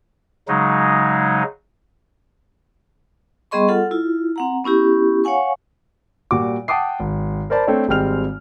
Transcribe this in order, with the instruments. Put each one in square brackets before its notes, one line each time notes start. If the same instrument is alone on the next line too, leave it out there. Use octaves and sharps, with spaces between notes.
[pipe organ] C#3 F#3 G#3 D#4
[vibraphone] G3 B3 G#4 D#5 C6 C#6
F4 A4 F#5
E4 F4
C4 F#5 A#5
B3 C#4 E4 G4
C#5 F5 F#5 G#5 C#6
[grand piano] A#2 G3 F#4 D6
F#5 G5 A5 D6 D#6 C7
G#1
A#4 C5 D5 A5 B5
A3 C4 D4 A4 C#5
G#1 G3 G#3 C4 F6 F7